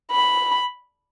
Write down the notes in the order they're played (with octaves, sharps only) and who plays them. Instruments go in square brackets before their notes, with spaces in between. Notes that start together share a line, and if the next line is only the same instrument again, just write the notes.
[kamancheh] B5